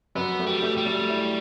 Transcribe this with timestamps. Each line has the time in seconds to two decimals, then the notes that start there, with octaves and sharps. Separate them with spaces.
0.15 F#2 B3
0.39 A3
0.47 G3
0.62 A3
0.78 G3
0.86 A3
1.10 E4